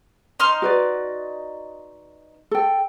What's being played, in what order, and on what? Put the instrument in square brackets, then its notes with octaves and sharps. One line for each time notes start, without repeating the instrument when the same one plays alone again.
[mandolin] D#4 C6 F6
[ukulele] F#4 B4 D5
A4 G5